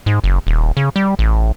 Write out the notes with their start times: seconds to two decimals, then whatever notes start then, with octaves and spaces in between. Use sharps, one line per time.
0.06 G#2
0.24 F#1
0.47 D#1
0.77 C#3
0.96 G3
1.19 A1